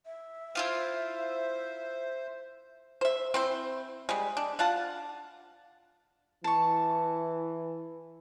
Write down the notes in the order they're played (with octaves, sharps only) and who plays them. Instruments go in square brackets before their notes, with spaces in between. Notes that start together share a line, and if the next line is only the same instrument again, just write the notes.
[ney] E5
[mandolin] E4 F4 F5 [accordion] C5
[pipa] C5 E5
C4 E4 C5
G3 G#3
D4
D4 F4 F#5 A5
[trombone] E3 [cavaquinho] A5 C#6